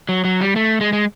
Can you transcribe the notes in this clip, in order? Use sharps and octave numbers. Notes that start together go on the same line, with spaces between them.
F#3
F#3
G3
A3
G#3
G#3